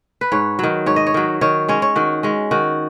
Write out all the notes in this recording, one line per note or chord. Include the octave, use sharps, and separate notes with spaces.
B4
G#2 C#5
D#3 F#3
G#2 C#5
D#5
C#5
D#3 F#3
D#3 C#5
G#3 C#4 C#5
C#5
D#3 F#4
G#3 C#4
D#3 F#4